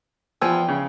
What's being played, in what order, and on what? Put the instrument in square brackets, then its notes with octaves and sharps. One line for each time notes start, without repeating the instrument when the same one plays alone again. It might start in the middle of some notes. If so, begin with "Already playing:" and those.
[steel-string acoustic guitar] E2 B3 G5 [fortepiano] F3 G#5 E6
[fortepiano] C#3